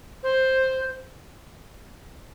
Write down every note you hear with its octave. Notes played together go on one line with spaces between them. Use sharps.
C5